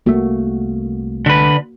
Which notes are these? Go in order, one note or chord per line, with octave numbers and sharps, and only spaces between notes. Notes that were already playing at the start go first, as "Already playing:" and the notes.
C2 A3 A#3 F#4
D3 B4